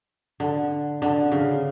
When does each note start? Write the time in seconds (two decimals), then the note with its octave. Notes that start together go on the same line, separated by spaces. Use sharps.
0.40 D3
1.02 D3
1.32 C#3